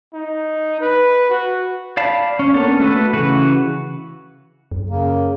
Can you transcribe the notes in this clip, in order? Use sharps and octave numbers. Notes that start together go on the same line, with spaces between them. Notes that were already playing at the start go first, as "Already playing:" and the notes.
D#4
B4
F#4
D5 F5 A5 B5
C#4
A#3 B3 C#4 D4 A4
A3 F#4 A4 B4
C#3 E3 F#4 B4
F#2
C#3 A#3